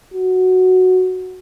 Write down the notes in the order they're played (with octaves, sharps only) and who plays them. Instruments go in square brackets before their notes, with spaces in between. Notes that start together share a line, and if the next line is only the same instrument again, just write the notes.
[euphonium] F#4